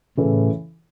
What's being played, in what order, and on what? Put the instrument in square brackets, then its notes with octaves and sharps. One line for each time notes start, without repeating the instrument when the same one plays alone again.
[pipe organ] A2 [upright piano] C#3 E3 C#4 E4 A4